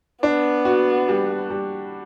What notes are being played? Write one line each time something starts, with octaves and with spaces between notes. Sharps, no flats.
B3 D4
F#4
G3
G3